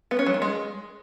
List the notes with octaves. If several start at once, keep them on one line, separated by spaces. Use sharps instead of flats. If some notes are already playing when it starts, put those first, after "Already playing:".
B3
C#4
F#3
D#3
G#3